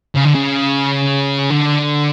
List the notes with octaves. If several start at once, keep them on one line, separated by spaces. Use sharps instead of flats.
C#3
D3
C#3
D3